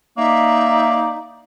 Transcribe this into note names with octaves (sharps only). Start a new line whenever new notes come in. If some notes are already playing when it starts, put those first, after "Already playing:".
A#3 D#4 D5 E5